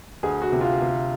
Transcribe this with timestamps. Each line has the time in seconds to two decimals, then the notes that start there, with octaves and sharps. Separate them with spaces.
0.23 D2 G#4
0.42 F#4
0.52 C3
0.61 F4
0.81 C3